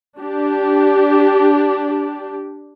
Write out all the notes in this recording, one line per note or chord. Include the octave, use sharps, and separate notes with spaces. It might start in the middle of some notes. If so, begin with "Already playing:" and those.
D4 G4